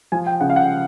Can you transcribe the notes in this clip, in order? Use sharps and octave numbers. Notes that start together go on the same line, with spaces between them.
F3 G#5
G5
C#3 F#5
F5
F#5